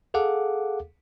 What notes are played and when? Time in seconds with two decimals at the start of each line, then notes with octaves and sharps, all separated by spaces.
0.14 G#4 A4 F5 F#5 D6